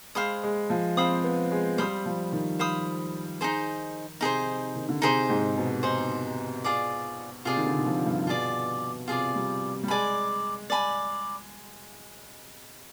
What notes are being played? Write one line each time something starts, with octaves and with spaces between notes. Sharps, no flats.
G#3 C5 F5 B5 D#6
G#3
F3
C4 C5 F5 B5 D#6
B3
G#3
G3 C5 F5 B5 D#6
F3
D#3
C5 F5 B5 D#6
D#4 G#4 C5
C3 D#4 G#4 C5
D#3
D3
C3 D#4 G#4 C5
G#2
B2
D#4 G#4 C5
F4 G#4 D5
C3 F4 G#4 D5
D#3
D3
D#3
F3
G2
B2 F4 G#4 D5
C3 F4 G#4 D5
G3
G3
G#3 D5 G#5 B5
D5 G#5 B5